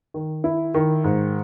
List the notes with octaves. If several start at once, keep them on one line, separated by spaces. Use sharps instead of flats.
D#3
E4
D#3
G#2